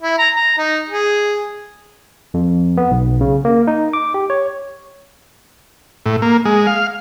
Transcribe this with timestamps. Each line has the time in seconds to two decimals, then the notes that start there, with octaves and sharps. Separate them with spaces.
0.02 E4
0.18 A#5
0.36 A#5
0.58 D#4
0.89 G#4
2.34 F2
2.77 B3
2.91 B1
3.21 C#3
3.45 A#3
3.67 D#4
3.93 D6
4.14 G4
4.30 C#5
6.06 A2
6.22 A#3
6.45 G#3
6.67 F5